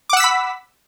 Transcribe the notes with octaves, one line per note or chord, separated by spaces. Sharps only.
F#5 B5 D6 E6 B6